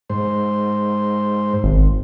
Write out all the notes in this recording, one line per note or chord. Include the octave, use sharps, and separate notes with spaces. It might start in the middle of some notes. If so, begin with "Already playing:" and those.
G#2 C5
G#1